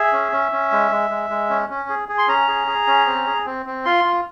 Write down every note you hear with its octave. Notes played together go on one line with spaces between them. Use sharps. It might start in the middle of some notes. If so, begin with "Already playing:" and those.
Already playing: G#4 E5
C#4
C#4
C#4
G#3
G#3
G#3
G#3
C#4
C#4
G#4
G#4
C6
C#4 A#5
G#4
G#4
C#4
C4
G#4
C4
C4
F4 C6
F4